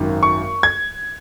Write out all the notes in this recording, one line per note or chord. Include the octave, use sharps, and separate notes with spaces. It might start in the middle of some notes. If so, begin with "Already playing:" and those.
Already playing: G#1 F#2 D#3
C#6
G#6